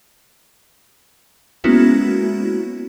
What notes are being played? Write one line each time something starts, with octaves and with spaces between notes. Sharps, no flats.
G#3 A#3 B3 C#4 E4 F#4